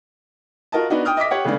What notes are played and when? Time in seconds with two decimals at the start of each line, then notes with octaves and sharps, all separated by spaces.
0.72 F4 F#4 A#4 D#5 A5
0.90 B3 D4 D#4 F#4
1.05 G5 D#6 F6
1.17 D#5 E5 D6 B6
1.31 G4 C#5 F#5
1.45 C#3 G#3 A3 B3 D4